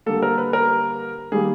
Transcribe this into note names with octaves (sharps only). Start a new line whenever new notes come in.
D3 G3 A#3 A4
A#4
B4
A#4
D#3 G3 A#3 G#4